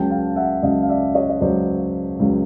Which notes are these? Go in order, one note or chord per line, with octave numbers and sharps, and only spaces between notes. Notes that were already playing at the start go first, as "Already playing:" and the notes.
Already playing: C#2 C#3 F#3 G5 A5
F5 G5
E5 F#5
C#2 C#3 F#3 D#5 F5
F5
D5 E5
C#5 D#5
D#5
C#2 C#3 F#3 C5 D5
C#2 C#3 F#3